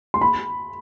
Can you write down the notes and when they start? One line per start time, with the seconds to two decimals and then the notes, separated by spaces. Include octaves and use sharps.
0.14 C6
0.21 B5